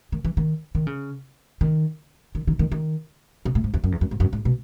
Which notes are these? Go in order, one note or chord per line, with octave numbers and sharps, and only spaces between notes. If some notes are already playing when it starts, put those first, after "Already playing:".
D#3
E3
D#3
D#3
C#3
D#3
D#3
D#3
D#3
D#3
B2
A2
G#2
E2
F#2
E2
F#2
G#2
F#2
G#2
B2